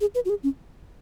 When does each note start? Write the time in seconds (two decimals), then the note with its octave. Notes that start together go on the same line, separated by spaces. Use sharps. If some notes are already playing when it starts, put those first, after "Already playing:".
0.01 G#4
0.15 B4
0.25 F#4
0.30 G#4
0.43 C#4